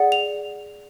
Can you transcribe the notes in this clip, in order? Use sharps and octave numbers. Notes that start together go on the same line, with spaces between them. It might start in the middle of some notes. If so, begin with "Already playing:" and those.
Already playing: G#4 D5 F#5
F7